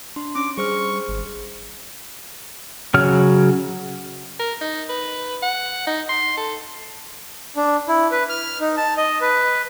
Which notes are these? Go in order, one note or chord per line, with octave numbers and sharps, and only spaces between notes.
D4 C6
C#4 D6
G3 G#4 C5 C#6 F6
G#1
C#3 F#3 C#5 F6
A#4
D#4
B4
F#5
D#4
C6
A4
D4
E4
B4
F6
D#4
A5
D#5
B4